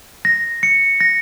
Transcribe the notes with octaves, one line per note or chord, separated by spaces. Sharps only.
A#6
C#7
A#6